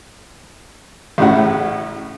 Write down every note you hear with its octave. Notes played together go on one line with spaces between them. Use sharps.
A1 A2 C#3 E4 F#5